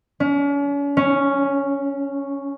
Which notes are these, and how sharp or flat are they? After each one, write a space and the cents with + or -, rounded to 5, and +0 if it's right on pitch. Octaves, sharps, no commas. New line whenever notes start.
C#4 +40
C#4 +0